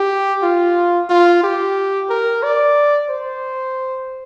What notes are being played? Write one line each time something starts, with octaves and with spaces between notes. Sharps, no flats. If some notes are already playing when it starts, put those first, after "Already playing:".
Already playing: G4
F4
F4
G4
A#4
D5
C5